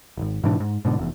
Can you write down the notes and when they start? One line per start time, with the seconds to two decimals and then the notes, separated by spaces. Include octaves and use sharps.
0.17 D#1 G#1
0.44 G#2 B2 E3 D4
0.60 G#2
0.85 G#2 B2 D3
0.98 F1 E2